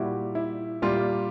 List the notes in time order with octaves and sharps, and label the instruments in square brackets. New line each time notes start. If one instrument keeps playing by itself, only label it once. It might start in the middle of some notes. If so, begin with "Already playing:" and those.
Already playing: [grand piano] A#2 G3 E4 F#4
E4
A#2 G3 F4